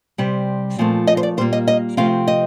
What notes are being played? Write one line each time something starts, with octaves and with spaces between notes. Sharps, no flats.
C3 G3 C4
A#2 F3 A3 C4
D#5
C5
D5
A#2 G3 A#3 C5
D#5
D#5
C3 F3 A3 C4 F5
D#5